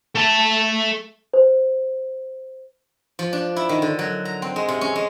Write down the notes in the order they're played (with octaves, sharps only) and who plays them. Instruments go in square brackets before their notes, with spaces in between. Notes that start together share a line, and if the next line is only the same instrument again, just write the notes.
[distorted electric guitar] A3 A5
[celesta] C5
[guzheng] F3
D4
E4
D#3
D3
F#3
A#5
C4
G#3
C3
C#4
G#3